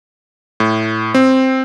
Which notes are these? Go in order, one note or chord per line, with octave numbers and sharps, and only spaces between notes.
A2
C4